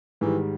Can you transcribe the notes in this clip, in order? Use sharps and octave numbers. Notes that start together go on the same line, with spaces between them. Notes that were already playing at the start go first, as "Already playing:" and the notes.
G#2 D#3 E3 G3